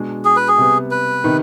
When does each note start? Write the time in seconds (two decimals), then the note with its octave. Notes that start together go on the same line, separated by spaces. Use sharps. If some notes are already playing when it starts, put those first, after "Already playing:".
Already playing: B2 G#3 D4
0.25 G#4
0.36 B4
0.48 G#4
0.58 C3 G3 B3
0.91 B4
1.24 C3 D#3 B3 D#4